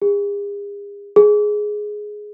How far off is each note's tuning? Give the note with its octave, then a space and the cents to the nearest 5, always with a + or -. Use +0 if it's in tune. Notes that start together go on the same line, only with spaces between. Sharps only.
G#4 -40
G#4 +10